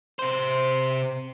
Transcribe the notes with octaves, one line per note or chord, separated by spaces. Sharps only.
C3 C5